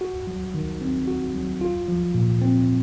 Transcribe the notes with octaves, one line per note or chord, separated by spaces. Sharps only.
F#4
F#3
D#3
C4
F#4
F#3
F4
F3
A#2
C4